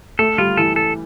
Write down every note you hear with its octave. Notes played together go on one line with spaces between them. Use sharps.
A3 A4
G3 F4
E3 A4
A4